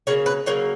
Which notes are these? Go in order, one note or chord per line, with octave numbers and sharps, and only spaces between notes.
C#3 F#3 A#3 C#5
B4
C#3 F#3 A#3 C#5